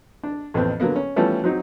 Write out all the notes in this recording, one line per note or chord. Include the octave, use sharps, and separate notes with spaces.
D4
A1 F2 B3 C4
D3 F#3 A#3 B3
C#4
E3 F3 G3 A3 B3 C#4
F#3 C4 D#4 F#4